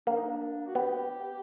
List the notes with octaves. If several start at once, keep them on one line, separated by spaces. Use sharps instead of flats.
A#3 D4
D#4
D4
F#4
B3 G4